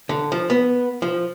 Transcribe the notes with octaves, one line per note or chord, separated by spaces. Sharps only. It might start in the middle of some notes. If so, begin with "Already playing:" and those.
D3
F3
B3
F3